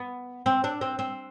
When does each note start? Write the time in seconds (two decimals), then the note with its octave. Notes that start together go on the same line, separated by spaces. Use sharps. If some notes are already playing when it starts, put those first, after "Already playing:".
Already playing: B3
0.46 C4
0.64 D4
0.81 C4
0.99 C4